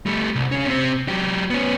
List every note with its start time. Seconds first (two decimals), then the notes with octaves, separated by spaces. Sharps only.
0.06 G3 A3
0.35 C2
0.52 C#3 C#4
0.66 C3 C4
1.08 F#3 G4
1.50 B3 C#4